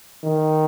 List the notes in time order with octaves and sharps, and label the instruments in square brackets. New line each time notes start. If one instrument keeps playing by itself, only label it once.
[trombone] D#3